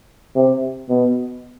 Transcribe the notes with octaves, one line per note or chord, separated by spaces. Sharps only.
C3
B2